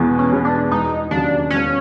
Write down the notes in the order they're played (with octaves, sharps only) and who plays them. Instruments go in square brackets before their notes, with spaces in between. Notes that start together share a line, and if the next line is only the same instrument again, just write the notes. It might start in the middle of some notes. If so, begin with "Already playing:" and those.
Already playing: [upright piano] E2 B2 G#3 B3
[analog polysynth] C#4
[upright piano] B2 G#3 B3
[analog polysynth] D4
[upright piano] E1 [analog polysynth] D#4
[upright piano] D#2 C#3 F#3 [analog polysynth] D4
[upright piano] E1 [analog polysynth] C#4